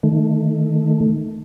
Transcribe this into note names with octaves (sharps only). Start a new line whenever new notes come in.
D#3 A3